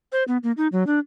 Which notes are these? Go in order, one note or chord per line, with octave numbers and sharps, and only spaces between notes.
C5
B3
A#3
D#4
F#3
D4